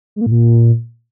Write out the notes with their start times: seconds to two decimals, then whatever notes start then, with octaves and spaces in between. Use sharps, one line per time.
0.16 G#3
0.21 A#3
0.26 A2
0.31 A#2